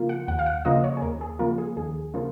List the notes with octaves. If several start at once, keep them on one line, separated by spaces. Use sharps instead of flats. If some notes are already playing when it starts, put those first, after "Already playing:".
Already playing: C#3 F3 A#3 F4
F#5
D#2 F#5
F5
F#5
C#3 F3 A#3 F4 D#5
C#5
G#4
D#2 A#4
G#4
C#3 F3 A#3 F4 A#4
G#4
D#2 G#4
C#3 F3 A#3 F4